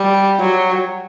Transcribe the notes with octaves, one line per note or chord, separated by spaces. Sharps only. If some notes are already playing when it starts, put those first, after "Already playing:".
Already playing: G3
F#3